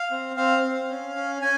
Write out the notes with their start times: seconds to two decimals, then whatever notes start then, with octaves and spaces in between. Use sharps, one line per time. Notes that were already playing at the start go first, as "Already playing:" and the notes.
Already playing: F5
0.11 C4
0.36 C4 F5
0.63 C4
0.90 C#4
1.16 C#4
1.41 C#4 G#5